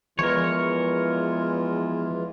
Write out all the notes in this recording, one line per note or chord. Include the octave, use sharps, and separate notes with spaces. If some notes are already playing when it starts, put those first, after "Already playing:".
E2 E3 F3 G#3 F4 A#4 C#5